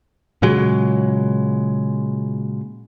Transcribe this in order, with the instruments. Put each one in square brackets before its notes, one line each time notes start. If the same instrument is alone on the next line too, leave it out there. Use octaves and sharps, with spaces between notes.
[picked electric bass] A#2 C#3 F#3 G#3